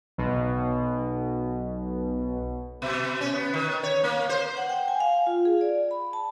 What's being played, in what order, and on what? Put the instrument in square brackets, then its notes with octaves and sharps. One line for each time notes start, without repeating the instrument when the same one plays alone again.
[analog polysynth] B1 B2
[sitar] B2
C#4
B3
D#3
C#5
A#3
C5
[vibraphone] F#5
G5
G#5
F5
F4
G#4
D5
B5
A5